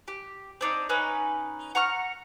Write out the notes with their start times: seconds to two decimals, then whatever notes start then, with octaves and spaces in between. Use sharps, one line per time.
0.08 G4
0.61 C4 D4 D#4
0.89 C#4 D#4 B4
1.75 F#5 A#5 C#6 F6